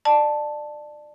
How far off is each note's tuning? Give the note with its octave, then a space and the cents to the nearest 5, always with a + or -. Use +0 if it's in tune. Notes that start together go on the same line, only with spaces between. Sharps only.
D5 +25 A5 +0